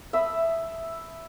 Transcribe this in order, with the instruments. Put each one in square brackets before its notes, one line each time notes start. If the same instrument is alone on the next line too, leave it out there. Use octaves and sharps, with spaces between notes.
[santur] E5 B5 D#6